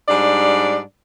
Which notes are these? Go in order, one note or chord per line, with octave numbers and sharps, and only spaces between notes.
G#2 G3 D4 D5